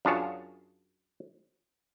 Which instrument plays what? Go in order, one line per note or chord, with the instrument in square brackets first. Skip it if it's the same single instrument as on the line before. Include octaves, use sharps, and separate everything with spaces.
[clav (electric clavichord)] F#2 D4 F4 G#4 C#5 A5